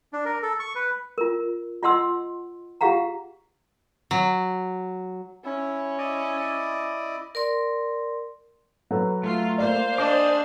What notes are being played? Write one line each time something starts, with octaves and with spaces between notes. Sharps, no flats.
D4
A#4
A4
C#6
B4
F4 A#4
F4 D#5 F#5 C6 E6
F4 G4 G#4 F5 F#5 A#5
F#3
C#4 E4
E4 D5 D#5
A#4 D5 C6
F#3 A4 B4
A3 F4
A#3 C5 D5 F5
D4 G#4 D#5 D6